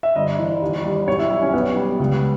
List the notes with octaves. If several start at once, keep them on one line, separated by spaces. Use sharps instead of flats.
E5
G1 D#5
E3
D#2
G3
B1 C#5
E4
G3 E4
C#4
B1 B3
G3
C#2